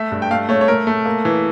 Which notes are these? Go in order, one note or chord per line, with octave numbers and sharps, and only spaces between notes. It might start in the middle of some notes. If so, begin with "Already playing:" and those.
Already playing: A3 E5
G2
G5
A3 F5
A3 C#5
C#5
A3 A#4
A3
A#3
E3